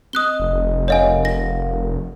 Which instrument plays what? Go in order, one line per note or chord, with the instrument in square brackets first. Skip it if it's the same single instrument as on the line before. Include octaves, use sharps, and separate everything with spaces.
[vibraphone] C4 D#5 [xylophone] D#6 F#6 G7
[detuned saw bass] F1
[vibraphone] A#4 F5 F#5 [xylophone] C#5 D#5 G#5
[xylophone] A#6